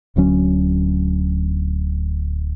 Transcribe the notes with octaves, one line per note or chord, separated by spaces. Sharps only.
D1 D2 F#3 C#4